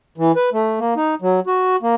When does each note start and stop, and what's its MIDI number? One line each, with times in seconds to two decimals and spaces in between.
0.18 0.32 52
0.36 0.50 71
0.53 0.79 57
0.79 0.94 58
0.96 1.15 63
1.22 1.40 54
1.47 1.76 66
1.82 1.95 58